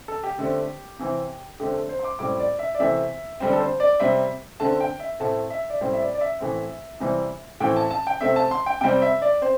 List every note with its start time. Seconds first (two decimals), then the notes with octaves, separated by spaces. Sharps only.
0.08 A4
0.23 G4
0.39 D3 A3 C4
0.99 C3 E3 C4
1.60 D3 A3 C4 G4
1.74 A4
1.89 C5
1.99 C6
2.04 D6
2.19 A2 G3 C4 D6
2.39 D5
2.59 E5
2.75 D5
2.80 C3 E3 A3 C4 E5
3.40 D3 G3 C4
3.53 A4
3.60 C5
3.80 D5
4.00 C3 G3 C4 E5
4.60 D3 A3 C4 A5
4.80 G5
5.00 E5
5.20 A2 A3 C4 A5
5.50 E5
5.70 D5
5.81 A2 G3 C4 C5
5.93 E5
6.01 D5
6.14 D5
6.21 E5
6.40 A2 E3 A3 C4
7.00 C3 E3 G3 C4
7.60 A2 E3 C4 G5
7.76 A5
7.91 A5
8.07 G5
8.21 C3 A3 C4 E5
8.36 A5
8.51 C6
8.66 G5
8.81 C3 G3 C4 G5
9.02 E5
9.22 D5
9.41 C4 C5